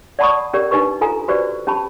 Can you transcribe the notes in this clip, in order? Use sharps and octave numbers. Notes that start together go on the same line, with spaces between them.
D5 F#5 A5 B5 C#6 D#6
C#4 G4 A#4 D5
D4 D#4 G4 B4 C#6
F4 A4 G#5 A#5
F#4 G4 B4 C5 D5
C#4 G4 A5 B5